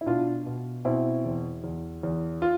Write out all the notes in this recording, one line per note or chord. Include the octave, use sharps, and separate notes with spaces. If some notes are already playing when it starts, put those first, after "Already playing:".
E4
B2 D4 F4
B2
B2 C4 E4
E2
E2
E2
F4